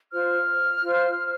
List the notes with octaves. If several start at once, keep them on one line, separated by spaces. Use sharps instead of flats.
F4 C5 F6
F4 C5